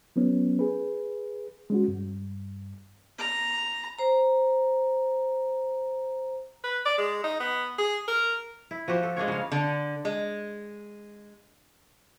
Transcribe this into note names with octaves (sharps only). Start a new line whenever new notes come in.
F#3 B3 C#4
G#4 B4
G#3 C#4 F#4
G2
A#5
C5 A#5
B4
D5
G#3
D#4
B3
G#4
A#4
E4
F3 F#4 G4 C5
A4
G#3 A#3 D4 C#5
C#3 F5
D3
G#3